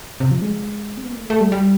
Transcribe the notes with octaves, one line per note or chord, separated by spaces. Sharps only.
C3
F3
G#3
C4
B3
A#3
A3
A3
G3
G3